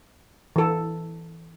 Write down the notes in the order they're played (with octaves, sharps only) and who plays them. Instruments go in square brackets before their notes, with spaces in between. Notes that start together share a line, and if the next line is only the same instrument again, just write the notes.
[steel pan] E3 A4